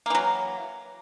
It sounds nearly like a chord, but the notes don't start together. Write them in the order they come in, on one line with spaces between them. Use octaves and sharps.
A#3 E3 F#3